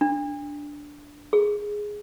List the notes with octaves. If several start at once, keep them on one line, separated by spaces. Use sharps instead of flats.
D4
G#4